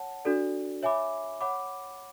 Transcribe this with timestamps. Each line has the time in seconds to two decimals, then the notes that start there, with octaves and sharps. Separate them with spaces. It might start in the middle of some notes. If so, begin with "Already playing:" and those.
Already playing: C#5 F#5 A5
0.25 D4 F#4 A4 D5
0.83 C#5 E5 G#5 B5 D6
1.41 C#5 F#5 B5 D6